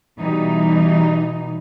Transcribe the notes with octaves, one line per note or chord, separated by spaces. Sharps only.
B2 E3 G3 D#4